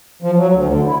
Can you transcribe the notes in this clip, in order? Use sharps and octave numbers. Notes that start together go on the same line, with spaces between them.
F3
F#3
D2
D3
E4